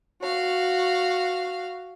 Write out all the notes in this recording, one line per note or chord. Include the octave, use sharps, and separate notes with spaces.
F#4 F5